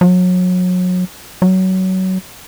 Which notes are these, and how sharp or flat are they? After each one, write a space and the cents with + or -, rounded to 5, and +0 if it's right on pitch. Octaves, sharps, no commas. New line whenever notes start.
F#3 -30
F#3 +20